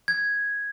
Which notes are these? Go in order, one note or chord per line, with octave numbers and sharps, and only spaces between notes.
G#6